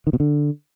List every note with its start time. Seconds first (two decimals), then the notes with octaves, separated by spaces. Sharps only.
0.07 D#3
0.13 B2
0.20 D3